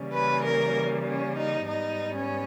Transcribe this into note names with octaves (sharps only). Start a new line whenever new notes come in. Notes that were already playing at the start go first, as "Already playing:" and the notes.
Already playing: C#3 E3 G3 A#3 C#4
B4
A#4
C#4
D#4
G#2 G3 B3 D#4
C#4